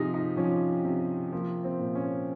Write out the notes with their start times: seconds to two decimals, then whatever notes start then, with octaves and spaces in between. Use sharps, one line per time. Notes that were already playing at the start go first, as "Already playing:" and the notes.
Already playing: C3 F3 D#4 F4 G4 G#4
0.14 D#4
0.37 F3 C#4
0.85 C3
1.32 F3 A#3
1.65 C4
1.80 A#2
1.95 C#4